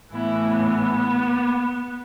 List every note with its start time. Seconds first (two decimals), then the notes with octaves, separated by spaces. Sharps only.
0.13 A2 E3 B3 E4
0.44 B3